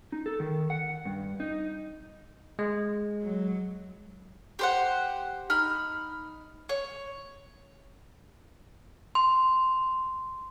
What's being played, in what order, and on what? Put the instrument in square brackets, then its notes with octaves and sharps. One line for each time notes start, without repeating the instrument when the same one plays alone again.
[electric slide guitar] D#4
A4
D#3
F#5
G2
D#4
[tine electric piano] G#3
[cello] F#3
[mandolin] G4 C5 F#5
D#4 B5 F6
C#5
[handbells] C6